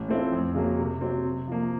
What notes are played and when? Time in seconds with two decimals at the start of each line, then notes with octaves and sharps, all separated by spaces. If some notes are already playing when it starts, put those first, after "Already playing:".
Already playing: A1
0.08 A2 A3 C4 F4
0.32 F2
0.54 C#3 F#3 A#3
0.78 C3
1.01 F#3 C4
1.24 C3
1.48 F3 A#3